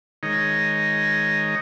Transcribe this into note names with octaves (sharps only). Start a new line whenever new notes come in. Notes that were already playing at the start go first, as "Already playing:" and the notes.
D#3 G#3 D#4 C#5 D#5